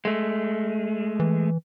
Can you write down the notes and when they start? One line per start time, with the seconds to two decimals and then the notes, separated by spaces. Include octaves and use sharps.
0.05 G#3 A3
1.20 E3